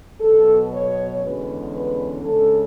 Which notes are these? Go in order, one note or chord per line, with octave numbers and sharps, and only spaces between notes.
B2 F#3 B3 A4
C#5
E2 D3 G#3 C#4 B4
B4
C#3 G#3 D4 A4